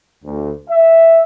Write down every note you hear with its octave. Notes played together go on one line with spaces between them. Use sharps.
D2
E5